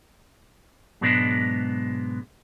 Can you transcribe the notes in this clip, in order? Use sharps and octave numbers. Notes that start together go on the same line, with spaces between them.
G#2 B2 F#3 G#3 B3 D4